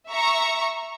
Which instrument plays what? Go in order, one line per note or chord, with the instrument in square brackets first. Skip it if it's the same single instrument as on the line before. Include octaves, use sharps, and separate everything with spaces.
[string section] E5 A#5 C#6